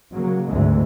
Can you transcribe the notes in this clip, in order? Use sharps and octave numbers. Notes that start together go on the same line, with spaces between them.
C#3 F#3 A#3
D2 G#2 E3 G#3 A3 C4